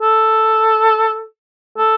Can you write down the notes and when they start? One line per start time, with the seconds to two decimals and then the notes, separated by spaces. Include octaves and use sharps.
0.01 A4
1.77 A4